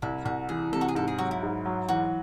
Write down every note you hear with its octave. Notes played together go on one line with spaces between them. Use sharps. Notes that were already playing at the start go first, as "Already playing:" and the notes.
C2 E4
C2 F#4
E3 G#4
C3 A4
F#4
G#4
G#2 A4
G#4
F#3 F#4
E4
G#2
F#3
E3 F#4